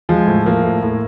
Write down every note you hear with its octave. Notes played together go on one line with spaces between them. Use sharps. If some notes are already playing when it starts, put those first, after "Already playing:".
F3 G#3
A2
F3 A#3
A2
A2